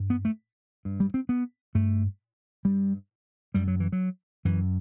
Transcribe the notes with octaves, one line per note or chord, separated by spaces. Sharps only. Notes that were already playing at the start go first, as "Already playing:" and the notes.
Already playing: G2
B3
A3
G2
G3
C4
B3
G2 A3
G2 G3
F#2 G3
F#3
E3
F#3
F#2 E3